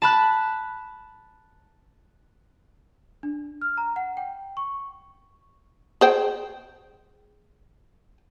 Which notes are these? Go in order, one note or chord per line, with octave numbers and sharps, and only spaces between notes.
A5 B5 F#6
D4
F6
A#5
F#5
G5
C#6
G#4 C5 G5